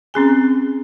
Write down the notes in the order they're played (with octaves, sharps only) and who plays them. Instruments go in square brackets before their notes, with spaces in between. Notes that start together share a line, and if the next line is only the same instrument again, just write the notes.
[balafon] C4 C#4 G#4 G#5